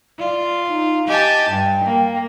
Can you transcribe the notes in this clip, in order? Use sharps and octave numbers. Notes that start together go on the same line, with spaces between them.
F4 D5
D#4
G4 D#5 G#5 A5
G2 G5
A#3